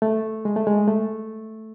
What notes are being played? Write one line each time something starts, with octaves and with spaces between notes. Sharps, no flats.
A3
G#3
A3
G#3
A3